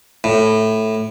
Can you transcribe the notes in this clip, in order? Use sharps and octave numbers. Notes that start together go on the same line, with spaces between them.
A2